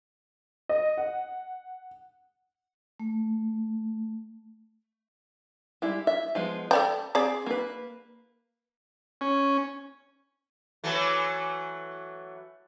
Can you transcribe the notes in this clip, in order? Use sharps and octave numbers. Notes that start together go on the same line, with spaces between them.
D#5
F#5
A3
G3 G#3 E4
E5
F3 G#3 B3
A4 D5 G5 A5
C4 G#4 D5
A#3 B4
C#4
E3 F#3 A3